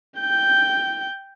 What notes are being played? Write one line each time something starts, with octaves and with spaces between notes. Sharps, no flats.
G5 G6